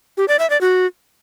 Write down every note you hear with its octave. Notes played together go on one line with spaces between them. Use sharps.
G4
D5
E5
D5
F#4